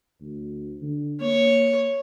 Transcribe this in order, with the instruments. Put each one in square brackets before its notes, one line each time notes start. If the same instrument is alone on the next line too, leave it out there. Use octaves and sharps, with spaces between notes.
[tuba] D2
D3
[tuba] A#3 [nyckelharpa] C#5